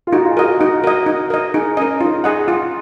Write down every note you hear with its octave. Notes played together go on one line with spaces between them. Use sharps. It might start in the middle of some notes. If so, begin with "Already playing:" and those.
F4
D#4 F#4
F4
G#4
F#4 A#4 D#5
F#4
D#4 F#4
A#4 D#5
D#4
A#4 D#5
D#4 G#4
C#4 A#4 D#5
D#4 F4
G#4 D#5 F#5
F4